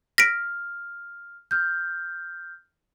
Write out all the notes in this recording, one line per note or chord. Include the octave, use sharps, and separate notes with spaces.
F6 A#6 B6 D7
F6 G6